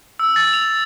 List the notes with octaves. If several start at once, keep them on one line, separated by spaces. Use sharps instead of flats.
E6
A6
F7